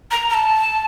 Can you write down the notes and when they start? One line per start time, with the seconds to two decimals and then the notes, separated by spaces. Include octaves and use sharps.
0.11 A#5
0.29 A#5
0.34 A5